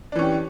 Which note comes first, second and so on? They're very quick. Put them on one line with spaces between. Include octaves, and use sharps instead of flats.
D4 E3 C#4 G4